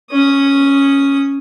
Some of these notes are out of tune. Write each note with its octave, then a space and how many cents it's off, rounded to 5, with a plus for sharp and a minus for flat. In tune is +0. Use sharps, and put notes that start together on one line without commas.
C#4 +0 D#6 +0